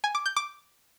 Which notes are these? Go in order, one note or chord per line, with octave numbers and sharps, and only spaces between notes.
G#5
D6
G6
D6